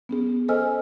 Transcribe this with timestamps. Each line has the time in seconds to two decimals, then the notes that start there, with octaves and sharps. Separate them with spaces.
0.09 B3 C#4 G#4
0.48 A4 C5 D#5 G#5 E6 F6